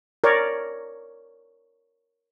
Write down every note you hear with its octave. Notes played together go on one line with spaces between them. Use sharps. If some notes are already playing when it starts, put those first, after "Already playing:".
A#4 C#5 D5